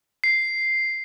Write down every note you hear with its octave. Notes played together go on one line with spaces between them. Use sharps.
C7